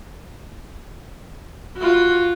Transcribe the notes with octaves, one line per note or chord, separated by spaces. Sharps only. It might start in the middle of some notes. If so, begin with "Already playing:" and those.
F4 F#4